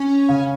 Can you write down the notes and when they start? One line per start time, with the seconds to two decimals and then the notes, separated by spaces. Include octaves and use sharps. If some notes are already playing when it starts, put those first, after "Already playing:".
Already playing: C#4
0.29 C#3